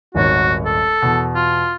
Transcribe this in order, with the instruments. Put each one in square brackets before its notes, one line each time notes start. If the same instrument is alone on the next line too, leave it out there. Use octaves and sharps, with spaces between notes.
[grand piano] D#1 G#1 C#5 [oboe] F#4
[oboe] A4
[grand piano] E2 B2
[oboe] F4